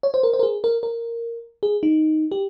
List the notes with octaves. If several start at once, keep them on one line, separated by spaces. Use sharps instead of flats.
C#5
C5
A#4
C5
A#4
G#4
A#4
A#4
G#4
D#4
G4